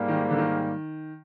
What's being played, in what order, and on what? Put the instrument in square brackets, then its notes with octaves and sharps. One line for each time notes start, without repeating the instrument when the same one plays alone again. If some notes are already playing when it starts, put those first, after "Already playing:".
Already playing: [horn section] G#2 G3 A#3
[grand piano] D#3
D3
D#3